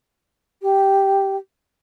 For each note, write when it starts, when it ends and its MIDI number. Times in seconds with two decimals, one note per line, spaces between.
0.62 1.36 67